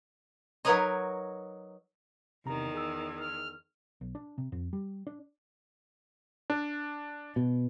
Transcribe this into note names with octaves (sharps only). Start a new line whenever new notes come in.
F#3 D#4 A#4 B4 C#5 D#5
E2 C3 D#3 A#5
G#4 E6
F6
B1
D4
C3
F2
G3
D4
D4
B2